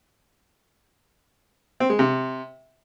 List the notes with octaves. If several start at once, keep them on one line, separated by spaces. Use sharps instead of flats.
C4
G#3
C3